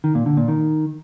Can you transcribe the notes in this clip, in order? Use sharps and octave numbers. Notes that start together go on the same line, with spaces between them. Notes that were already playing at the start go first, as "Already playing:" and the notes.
D#3
A#2
D3
A#2
D#3